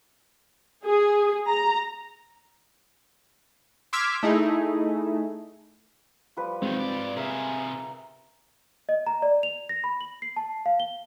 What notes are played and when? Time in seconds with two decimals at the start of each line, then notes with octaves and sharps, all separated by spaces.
0.85 G#4
1.47 A#5
3.93 C6 D6 E6 F6 G#6 B6
4.23 A3 D#4 E4 G#4
6.37 F3 G3 B4
6.62 D#3 F#3 G#3 C4
6.79 G#2 D5
7.16 C3 G#4 A#4 E5
8.89 D#5
9.06 A#5
9.22 D5
9.43 F7
9.69 A#6
9.84 B5
10.01 F#7
10.22 C7
10.36 A5
10.66 F5
10.80 G7